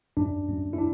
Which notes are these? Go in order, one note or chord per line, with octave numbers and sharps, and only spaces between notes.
F#2 D4
F#2
E4
D4